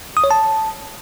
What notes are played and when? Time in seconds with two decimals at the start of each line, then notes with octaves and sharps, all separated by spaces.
0.17 D#6
0.24 C#5
0.31 A5